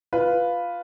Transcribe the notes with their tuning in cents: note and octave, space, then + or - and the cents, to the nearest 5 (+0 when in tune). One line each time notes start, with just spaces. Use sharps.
F4 +0 B4 +0